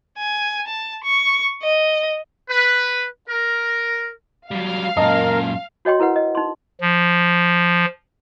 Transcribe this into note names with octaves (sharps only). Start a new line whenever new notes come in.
G#5
A5
C#6
D#5
B4
A#4
F#3 G3 F5
F#2 A#2 A#4 D#5 A5
F#4 C#5 D#5 G5 C6
E4 A#4 B4 F#5
D#5
D#4 C6
F3